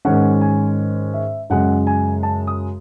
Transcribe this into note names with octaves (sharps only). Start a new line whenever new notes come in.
G#2 D#3 G#3 C#4 F#5
G#5
E5
F#2 C#3 G#3 F#5
G#5
A5
D#6